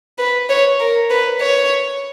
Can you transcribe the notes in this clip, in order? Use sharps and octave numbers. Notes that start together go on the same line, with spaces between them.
B4
C#5
A#4
B4
C#5